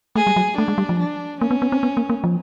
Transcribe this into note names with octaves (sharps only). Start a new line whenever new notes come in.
A3 G#4
G3
F#3
A3 D4
G#3
G3
F3
D4
A#3 C#4
B3
B3
C4
B3
A#3
A#3
F3